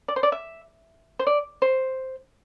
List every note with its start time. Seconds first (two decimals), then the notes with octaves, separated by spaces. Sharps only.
0.08 D5
0.16 C5
0.23 D5
0.32 E5
1.19 C5
1.27 D5
1.62 C5